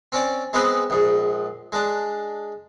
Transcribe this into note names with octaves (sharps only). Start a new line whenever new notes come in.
C4 C#4 D5
G#3 B3 C4 G#4 B4 C5
A#1 G#2
G#3 D4